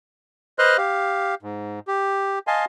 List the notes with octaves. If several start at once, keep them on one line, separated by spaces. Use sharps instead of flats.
B4 C5 D#5 C6 F6 F#6
G4 F5
G#2
G4
D#5 F5 G#5 A5 C6